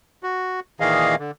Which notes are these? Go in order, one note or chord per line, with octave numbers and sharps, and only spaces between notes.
F#4
A#2 D#3 E3 G#4 D#5 F5
D3